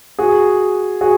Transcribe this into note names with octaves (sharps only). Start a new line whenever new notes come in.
F#4 G#4
F#4 G#4